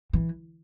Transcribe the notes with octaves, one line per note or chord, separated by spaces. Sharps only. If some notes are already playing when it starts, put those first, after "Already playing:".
E3